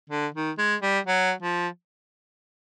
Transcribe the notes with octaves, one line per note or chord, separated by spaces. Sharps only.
D3
D#3
G#3
G3
F#3
F3